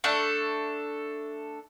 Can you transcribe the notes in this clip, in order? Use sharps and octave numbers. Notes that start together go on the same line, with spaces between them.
A3 D4 A4